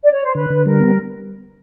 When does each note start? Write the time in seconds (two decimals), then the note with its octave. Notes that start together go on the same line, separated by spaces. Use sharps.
0.03 D5
0.13 C#5
0.25 C5
0.35 D3 B4
0.50 D3
0.65 G3 A#4
0.80 B3